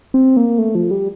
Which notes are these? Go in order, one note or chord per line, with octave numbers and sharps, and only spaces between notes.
C4
A#3
A3
F3
G3